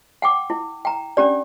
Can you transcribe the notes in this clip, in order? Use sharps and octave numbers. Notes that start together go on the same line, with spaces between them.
F#5 G5 D6
E4
G5 A#5
C#4 D4 G4 D5